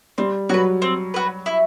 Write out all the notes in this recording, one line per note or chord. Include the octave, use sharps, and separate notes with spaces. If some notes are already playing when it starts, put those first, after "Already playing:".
G3 C4
F#3 F#4 B4
C4
F#4 B4
E4